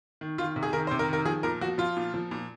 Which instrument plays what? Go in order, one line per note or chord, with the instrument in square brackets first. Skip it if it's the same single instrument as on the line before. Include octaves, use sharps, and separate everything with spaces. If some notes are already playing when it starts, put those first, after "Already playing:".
[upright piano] D#3
D#3 F4
C3
G#4
D#3 A#4
C5
C3
A#4
D#3
A#4
F3 G#4
A#2 A#4
F3 F#4
F3 F4
A#2
F3
A#2